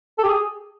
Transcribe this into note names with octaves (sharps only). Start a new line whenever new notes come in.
A4
G4
G#4